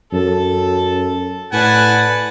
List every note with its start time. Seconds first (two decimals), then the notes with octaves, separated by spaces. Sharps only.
0.12 F#2 A4
1.53 A2 B4 D5 F#5 G#5 A5